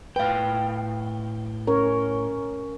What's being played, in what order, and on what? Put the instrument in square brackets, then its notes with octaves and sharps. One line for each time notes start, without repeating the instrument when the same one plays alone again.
[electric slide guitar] A2 G5 [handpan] B4 F5
[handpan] C#4 A#4 C#5